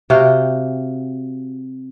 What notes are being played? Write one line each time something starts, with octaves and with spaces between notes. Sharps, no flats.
C3 F#4 F5 G5